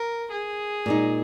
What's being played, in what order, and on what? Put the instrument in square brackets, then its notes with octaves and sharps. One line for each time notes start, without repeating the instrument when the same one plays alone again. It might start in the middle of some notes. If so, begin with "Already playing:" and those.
Already playing: [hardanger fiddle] A#4
G#4
[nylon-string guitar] A#2 G#3 D#4